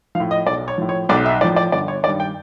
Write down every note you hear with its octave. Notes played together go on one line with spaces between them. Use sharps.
F3 F5
A2
D#5
B1 D5
C#5
A2 F3
C#5
B1 D5
E5
A2 F3 D5
D5
G1 D5
C#5
G2 D#3 D5
G5